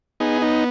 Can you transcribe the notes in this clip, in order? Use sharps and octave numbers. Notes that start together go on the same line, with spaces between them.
B3 D#4 G#4
D#4